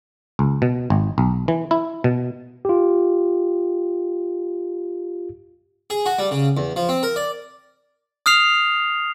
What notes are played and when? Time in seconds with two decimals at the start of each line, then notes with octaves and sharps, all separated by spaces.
0.39 C#2
0.62 B2
0.90 G#1
1.18 B1
1.48 E3
1.71 E4
2.04 B2
2.65 F4 G4
5.90 G#4
6.06 F#4
6.19 G3
6.31 C#3
6.57 E2
6.76 F3
6.89 C4
7.03 A#4
7.16 D5
8.26 D#6 F6 C7 F7